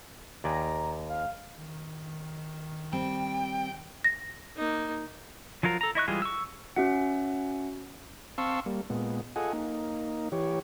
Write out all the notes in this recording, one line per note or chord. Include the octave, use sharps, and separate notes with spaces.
D#2 D5 G#5 A#5
F5
D#3
G3 C4 G5
A#6
A#3 D#4
F3 F#3 F4 A#4
A4 A#5
E4 D#5 C#6 F#6
E3 G3 G#3 F4 G#4
C#6 E6
C#4 F#4 E5 F#5
C4 F5 A5 C6 C#6 E6
G3 A#3
A#2 G#3 B3
F4 G#4 A4 D#5 F#5 G#5
A#3 D#4
E3 G4 C#5